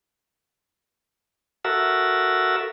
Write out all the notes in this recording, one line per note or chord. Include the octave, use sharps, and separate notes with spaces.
F#4 A4 A#4 E5